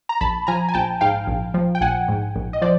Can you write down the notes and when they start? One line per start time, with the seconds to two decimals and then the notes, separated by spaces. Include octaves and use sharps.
0.09 A#5
0.21 A#1 A5 B5
0.47 F3 G#5 A#5
0.69 G#5
0.74 A#1 G5 A5
1.01 G#2 F5 G5
1.27 A#1
1.54 F3
1.75 G5
1.81 A#1 F#5 G#5
2.08 G#2
2.36 A#1
2.53 D#5
2.61 F3 C5 D5